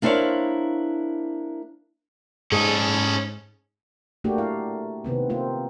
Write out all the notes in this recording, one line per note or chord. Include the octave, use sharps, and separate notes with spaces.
A#3 D4 E4 C5 C#5 F5
G#2 C#4 G#4 A4
A3 A#3 D4 F#4 G4
E4 F5
C3 D#3 B3 C4
A#3 C4 F4